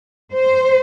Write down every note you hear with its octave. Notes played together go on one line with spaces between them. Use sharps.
C5